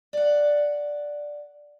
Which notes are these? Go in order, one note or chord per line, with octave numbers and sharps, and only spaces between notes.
D5 F#5